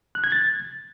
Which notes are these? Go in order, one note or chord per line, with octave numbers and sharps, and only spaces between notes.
F#6
G#6
A6